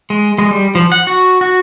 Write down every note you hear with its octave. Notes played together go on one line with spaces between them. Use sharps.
G#3
G#3
G3
F3
F#5
F#4
F#4